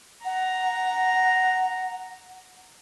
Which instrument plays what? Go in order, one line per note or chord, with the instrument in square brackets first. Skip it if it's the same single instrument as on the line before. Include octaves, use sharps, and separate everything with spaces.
[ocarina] F#5 [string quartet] A#5